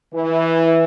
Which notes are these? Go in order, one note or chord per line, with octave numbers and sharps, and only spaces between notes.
E3